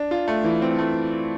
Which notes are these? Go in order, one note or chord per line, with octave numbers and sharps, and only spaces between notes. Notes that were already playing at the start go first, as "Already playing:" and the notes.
Already playing: D4
F4
A3
E3
C4
A3